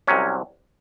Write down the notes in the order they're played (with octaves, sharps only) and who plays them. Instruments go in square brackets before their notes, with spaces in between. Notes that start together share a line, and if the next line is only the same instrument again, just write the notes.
[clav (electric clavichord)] C2 C3 F#3 C#4